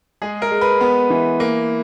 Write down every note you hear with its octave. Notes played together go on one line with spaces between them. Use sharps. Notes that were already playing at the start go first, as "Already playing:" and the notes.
G#3 G#4
A#4
G#3
B4
B3
E3
A#3